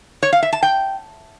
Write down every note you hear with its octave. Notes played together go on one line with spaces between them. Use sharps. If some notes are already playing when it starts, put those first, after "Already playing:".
C#5
F5
E5
A5
G5